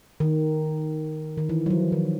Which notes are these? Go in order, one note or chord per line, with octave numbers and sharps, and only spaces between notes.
D#3
D#3
E3
F#3
F3
D#3